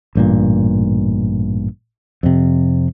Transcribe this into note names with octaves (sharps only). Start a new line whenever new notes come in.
A1 G2 A#2
F2 C3